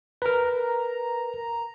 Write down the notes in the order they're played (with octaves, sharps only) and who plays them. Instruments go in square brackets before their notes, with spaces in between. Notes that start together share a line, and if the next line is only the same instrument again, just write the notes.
[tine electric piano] A#4 B4 [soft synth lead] A#5